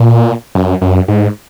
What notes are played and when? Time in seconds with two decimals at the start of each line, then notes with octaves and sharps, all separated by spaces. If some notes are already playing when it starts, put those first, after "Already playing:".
Already playing: A#2
0.55 F#2
0.82 F#2
1.08 G#2